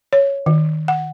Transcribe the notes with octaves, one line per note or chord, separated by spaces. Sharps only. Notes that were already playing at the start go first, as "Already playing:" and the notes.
C#5
D#3
F#5